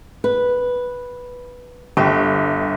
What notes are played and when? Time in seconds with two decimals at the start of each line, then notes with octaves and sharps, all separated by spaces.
0.24 B4
1.97 G1 G4